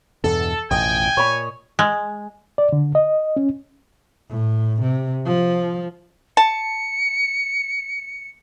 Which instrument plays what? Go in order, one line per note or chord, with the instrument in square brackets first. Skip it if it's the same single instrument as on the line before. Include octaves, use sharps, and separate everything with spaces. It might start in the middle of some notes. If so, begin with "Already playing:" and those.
[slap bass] E2 G2 B2 [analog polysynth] A4
[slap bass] A1 F2 B2 [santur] D#5 [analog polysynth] G5 [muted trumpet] G#5
[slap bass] A#2 [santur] C#5 B5
[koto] G#3
[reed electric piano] D5
D3
D#5
C#4
[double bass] A2
C3
F3
[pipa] A5 [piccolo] C#7